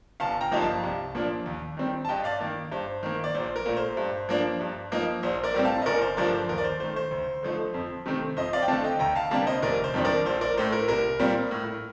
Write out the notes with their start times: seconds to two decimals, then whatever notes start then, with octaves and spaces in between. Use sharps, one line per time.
0.20 G1 F5 A5
0.41 G5 A#5
0.52 G2 F3 A#3 D#4
0.62 F5 A5
0.83 C2
1.15 A#2 F3 A#3 D4
1.46 D#2
1.77 D#3 G3 C4
2.05 A5
2.09 G2 D#5 G5
2.24 D5 F5
2.40 D#3 A#3
2.72 G2 C5
3.03 D#3 A#3
3.24 D5
3.35 A#1 C5
3.56 A#4
3.66 A#2 A3
3.76 C5
3.97 G2
4.29 F3 A#3 D4
4.60 G2
4.92 F3 A#3 D#4
5.23 A#1 C5
5.44 A#4 D5
5.54 A2 G3 C4
5.65 F5 A5
5.82 D#5
5.86 G1 A#4 D5
6.02 C5
6.17 G2 D3 F3 A3 A#4 D5
6.33 C5
6.49 D#2 A#4
6.58 D5
6.64 C5
6.80 D#3 A3 C5
6.96 C5
7.11 D2
7.43 D3 F3 A3 D#4
7.74 F2
8.06 C3 D#3 A3 C4
8.37 F2 C5 D#5
8.53 D5 F5
8.62 G5
8.68 D3 A3 C4 F5 A5
8.84 D#5 G5
8.99 D2 G5 A#5
9.15 F5 A5
9.31 C3 G3 A#3 D4 F5 A5
9.47 C5 D#5
9.62 F1 A#4 D5
9.84 C5
9.94 F2 D#3 G3 D4
10.05 A#4 D5
10.25 A#1 C5
10.41 A#4 D5
10.57 A2 A3 C5
10.72 A#4
10.88 C2 A#4
11.20 A#2 G3 C4
11.51 A2